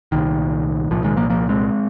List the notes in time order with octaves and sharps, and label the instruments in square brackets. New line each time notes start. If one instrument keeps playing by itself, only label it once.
[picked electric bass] C2 A#2 D#3
C2 A#2 F3
D#3 G#3
F3 A#3
F3 A#3
G#3 C4